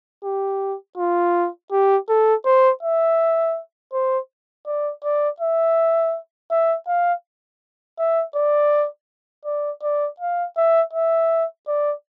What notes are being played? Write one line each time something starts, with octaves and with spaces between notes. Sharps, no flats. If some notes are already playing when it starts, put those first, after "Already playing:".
G4
F4
G4
A4
C5
E5
C5
D5
D5
E5
E5
F5
E5
D5
D5
D5
F5
E5
E5
D5